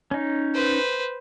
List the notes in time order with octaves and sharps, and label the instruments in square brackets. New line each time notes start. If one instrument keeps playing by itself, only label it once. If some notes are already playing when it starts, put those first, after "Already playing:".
[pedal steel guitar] C#4 D#4
[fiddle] B4 C5